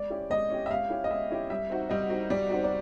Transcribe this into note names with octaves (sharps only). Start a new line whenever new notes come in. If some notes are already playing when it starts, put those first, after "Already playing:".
Already playing: G#3 D5
C#4 E4 G4
G#3 D#5
C#4 E4 G4
E5
G#3 F5
C#4 E4 G4
D#5
G#3 E5
C#4 E4 G4
G3 E5
C4 D#4 F#4
G3 D#5
C4 D#4 F#4
G3 D5
C4 D#4 F#4
D5